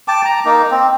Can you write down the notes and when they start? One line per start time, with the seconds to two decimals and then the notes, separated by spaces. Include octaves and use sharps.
0.08 G5 A5 D6
0.25 A#5
0.45 A#3 D#4
0.71 C4